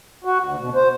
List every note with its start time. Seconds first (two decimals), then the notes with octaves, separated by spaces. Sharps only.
0.24 F#4
0.44 D2
0.59 B2
0.75 C5